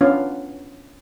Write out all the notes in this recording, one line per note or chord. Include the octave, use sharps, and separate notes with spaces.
B3 C#4 D4 F4 C#5 F5